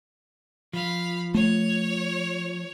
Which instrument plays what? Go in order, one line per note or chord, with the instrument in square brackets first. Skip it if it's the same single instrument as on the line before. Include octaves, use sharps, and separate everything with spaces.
[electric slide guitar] F3 [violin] F5 B5
[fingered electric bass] A3 [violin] C#5